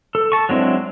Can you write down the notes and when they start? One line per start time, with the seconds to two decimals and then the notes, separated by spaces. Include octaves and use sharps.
0.15 A4
0.32 A5 C#6
0.49 F#3 G#3 C4 D4 E4